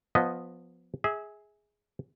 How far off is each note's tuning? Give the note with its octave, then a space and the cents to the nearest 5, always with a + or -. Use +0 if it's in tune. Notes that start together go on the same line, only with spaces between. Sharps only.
F3 +15 B3 +0 D#5 +0
G#4 +0 E5 -30